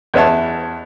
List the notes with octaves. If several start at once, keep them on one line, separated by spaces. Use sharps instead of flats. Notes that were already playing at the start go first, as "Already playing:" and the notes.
E2 B4 C#5 E5 A5